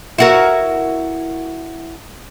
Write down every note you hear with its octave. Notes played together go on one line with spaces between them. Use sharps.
E4 F#4 A#4